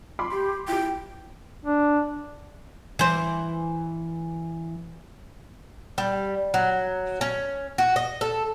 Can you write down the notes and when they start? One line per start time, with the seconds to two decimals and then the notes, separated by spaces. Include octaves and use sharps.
0.19 B5 C6 D6
0.32 G4
0.68 E4 G4 G5
1.65 D4
2.99 E3 C5
5.98 G3
6.54 F#3
7.21 C#4
7.78 F#4
7.96 D#5
8.21 A4